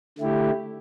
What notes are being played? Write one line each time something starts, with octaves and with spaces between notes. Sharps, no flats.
D3 A3 E4 G4